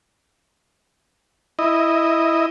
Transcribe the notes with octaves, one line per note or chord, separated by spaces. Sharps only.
E4 D#5